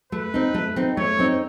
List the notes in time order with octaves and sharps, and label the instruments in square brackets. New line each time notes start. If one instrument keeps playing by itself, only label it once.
[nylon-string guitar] A3 [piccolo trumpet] B4
[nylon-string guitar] C4 D#4
A3
C4 D#4
[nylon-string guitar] A3 [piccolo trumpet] C#5
[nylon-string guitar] C4 D#4